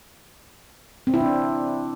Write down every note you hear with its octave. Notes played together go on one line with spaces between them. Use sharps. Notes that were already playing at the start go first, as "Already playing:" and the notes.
C4
E4
D4